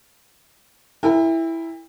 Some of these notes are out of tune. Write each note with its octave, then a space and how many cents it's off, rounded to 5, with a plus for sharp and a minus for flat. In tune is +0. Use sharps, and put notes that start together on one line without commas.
E4 +0 A#4 -30 G5 +40